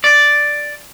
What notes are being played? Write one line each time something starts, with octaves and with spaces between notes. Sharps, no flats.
D5